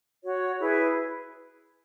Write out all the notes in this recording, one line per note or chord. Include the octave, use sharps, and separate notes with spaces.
F#4 C#5
E4 G#4 B4